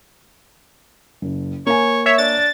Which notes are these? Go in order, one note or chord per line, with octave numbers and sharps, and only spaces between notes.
F#1
A#3 C#5 G#5
C#5 E5
D4 A6